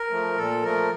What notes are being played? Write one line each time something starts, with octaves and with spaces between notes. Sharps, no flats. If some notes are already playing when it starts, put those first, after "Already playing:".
Already playing: A#4
F3 A3
A#2 A4
F3 A3 A#4